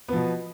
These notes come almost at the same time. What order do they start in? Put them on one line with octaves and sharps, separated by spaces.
B3 F3 B2